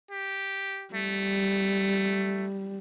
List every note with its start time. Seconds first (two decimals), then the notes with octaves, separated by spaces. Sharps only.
0.11 G4
0.94 G3 A3